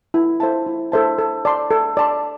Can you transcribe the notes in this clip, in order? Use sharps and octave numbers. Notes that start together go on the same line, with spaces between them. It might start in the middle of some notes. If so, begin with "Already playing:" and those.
E4
A4 C5 E5 A5
E4
A4 C5 E5 A5
A4
D5 A5 C6
A4
D5 A5 C6